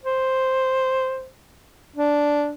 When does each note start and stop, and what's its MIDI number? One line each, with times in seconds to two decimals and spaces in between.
0.04 1.27 72
1.96 2.52 62